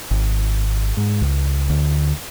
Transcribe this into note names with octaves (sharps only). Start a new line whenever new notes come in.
G#1
G#2
C#2
D2